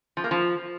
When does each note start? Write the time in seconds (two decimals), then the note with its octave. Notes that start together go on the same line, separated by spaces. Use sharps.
0.17 F3
0.24 A#3
0.31 F3